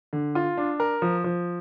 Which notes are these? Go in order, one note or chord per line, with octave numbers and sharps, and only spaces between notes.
D3
F4
D4
A#4
F3
F3